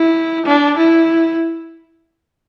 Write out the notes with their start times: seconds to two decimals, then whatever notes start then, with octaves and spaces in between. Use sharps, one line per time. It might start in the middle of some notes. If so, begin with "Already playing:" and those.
Already playing: E4
0.46 D4
0.77 E4